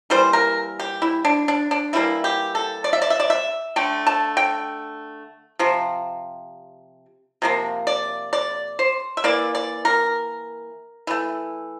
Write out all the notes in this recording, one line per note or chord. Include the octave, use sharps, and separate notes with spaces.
E3 G3 A#3 C5
A#4
G4
E4
D4
D4
D4
E3 G3 A#3 E4
G4
A4
D5
E5
D5
E5
D5
E5
D3 A3 G5
A5
G5
C3 F3
C3 F3 A#3
D5
D5
C5
E5
E3 A#3 D5
D5
A#4
E3 A3